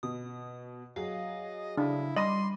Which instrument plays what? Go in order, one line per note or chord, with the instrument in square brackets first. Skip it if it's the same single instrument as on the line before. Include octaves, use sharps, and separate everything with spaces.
[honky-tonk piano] B2 [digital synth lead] D#6
[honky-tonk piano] F#3 G#4 [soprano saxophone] D#5 [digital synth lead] F5
[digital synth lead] C#3 [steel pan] D4 [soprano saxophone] E4
[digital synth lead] G3 [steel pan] D#5 [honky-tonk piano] B5 D6 D#7 [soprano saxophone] C6